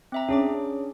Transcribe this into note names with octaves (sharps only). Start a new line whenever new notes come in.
C4 E5 A#5
C#4 D4 G#4 D6